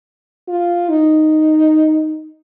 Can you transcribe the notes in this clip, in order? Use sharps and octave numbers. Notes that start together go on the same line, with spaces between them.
F4
D#4